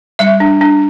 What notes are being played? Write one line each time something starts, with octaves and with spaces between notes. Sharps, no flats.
G3 E5
D4
D4